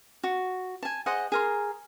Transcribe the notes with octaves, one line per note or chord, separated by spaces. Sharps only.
F#4
G#5 A5
G#4 C5 D#5 F#5
G#4 A#4 C6